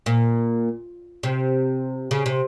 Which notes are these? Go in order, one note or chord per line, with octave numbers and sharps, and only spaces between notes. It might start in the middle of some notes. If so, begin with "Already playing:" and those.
A#2
C3
C#3
C3